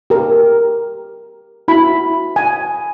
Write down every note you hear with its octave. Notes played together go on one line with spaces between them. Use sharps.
G4 A#4
E4 F#4 B5
G#5